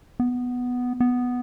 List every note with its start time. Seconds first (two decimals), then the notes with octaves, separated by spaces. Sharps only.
0.20 B3
1.00 B3